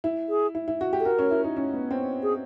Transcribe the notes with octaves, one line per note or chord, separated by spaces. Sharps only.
E4
G#4
E4
E4
F#4
G4
A4
F#4 A#4
C#4
E4
D#4
C#4
B3
C4
G#4